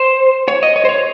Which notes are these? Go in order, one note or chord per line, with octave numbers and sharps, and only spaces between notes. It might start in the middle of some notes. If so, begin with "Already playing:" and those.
Already playing: C5
C#5
D#5
C#5
C5
C#5